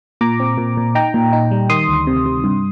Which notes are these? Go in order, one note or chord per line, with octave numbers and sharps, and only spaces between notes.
A#2 A#5 D6
C4
A#2
A#2
D#4 G5 A#5
A#2
D#4
G3
D#3 C6 D#6
D2
C3
C3
G2